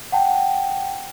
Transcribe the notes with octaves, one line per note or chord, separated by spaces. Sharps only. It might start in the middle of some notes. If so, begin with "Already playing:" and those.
F#5 G5 A5